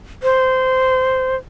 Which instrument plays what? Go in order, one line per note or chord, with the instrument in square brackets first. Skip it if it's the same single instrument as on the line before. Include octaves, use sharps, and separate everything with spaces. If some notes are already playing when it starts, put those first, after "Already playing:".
[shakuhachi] C5